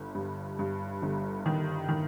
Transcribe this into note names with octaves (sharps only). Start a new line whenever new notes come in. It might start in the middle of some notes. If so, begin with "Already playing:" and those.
Already playing: G1
G2
G2
G1
D#3
D#3